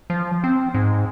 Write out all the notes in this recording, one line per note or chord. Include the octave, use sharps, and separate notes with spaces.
F3
C4
G#2